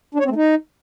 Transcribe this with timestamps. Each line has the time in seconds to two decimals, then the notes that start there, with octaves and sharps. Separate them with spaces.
0.15 D4
0.20 C#5
0.25 C4
0.31 A3
0.36 D#4